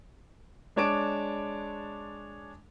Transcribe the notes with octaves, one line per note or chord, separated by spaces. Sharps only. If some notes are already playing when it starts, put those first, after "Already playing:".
G#3 D4 C#5 A5 D6 D7